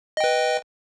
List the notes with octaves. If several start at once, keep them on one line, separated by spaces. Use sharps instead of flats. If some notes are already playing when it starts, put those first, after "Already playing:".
B4 D#5 G5